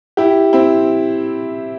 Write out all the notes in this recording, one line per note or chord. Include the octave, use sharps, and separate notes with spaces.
E4 G4
C4 E4